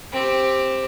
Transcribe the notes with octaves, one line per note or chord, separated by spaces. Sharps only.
C4 G4